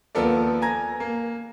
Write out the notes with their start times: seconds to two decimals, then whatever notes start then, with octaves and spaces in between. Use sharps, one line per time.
0.15 D#2 F3 B3 A4 A#4 D5
0.62 G#5 A#5 G#6 A#6
1.00 A#3